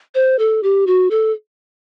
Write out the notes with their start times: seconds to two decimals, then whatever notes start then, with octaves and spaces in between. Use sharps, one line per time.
0.15 C5
0.39 A4
0.63 G4
0.87 F#4
1.11 A4